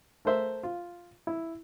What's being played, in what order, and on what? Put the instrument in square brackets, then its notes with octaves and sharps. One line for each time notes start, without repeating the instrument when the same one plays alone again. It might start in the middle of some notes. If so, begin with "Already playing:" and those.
[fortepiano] A3 A#4 C5 E5
F4
E4